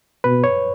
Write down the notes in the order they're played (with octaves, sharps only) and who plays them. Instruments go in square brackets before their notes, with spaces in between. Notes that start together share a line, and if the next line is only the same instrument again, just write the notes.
[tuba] B2 [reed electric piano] B4
[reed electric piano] C#5